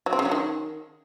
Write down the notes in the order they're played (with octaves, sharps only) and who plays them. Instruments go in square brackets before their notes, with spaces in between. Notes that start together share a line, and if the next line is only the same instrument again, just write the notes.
[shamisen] F#3
C4
C#3
F#3
D#3